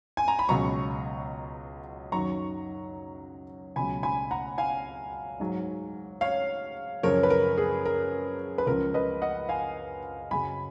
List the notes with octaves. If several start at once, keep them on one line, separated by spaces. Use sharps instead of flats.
G#5
A#5
B5
C#2 B2 F#3 A#5 C#6
F#2 D#3 F#3 A#5 C#6
C#2 B2 F#3 G#5 B5
G#5 B5
F#5 A#5
F5 G#5
G#2 F#3
C#5 F5
F#2 C#3 F3 A#4 C#5
B4
A#4
G#4
A#4
B4
C#2 C#3 F3 A#4
B4 D#5
D#5 F#5
F5 G#5
F#2 C#3 F#3 G#5 B5